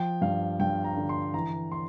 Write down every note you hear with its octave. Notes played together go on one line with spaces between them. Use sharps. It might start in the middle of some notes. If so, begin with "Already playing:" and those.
Already playing: F3 G5
G2 F5
G2 G5
A#5
D3
C6
E3 A#5
C6